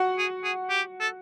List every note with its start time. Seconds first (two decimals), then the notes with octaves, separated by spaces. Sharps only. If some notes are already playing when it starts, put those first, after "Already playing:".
Already playing: F#4 F#5
0.18 G#4
0.44 G#4
0.69 G4
1.00 A4